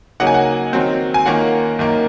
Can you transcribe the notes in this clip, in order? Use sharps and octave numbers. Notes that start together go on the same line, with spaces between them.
C#3 F#3 A#3 D#4 F#5
G#5
F#5
D#3 F#3 C4
G#5
D#3 A#3 C#4 F4 F#5
F#2 D#3 A#3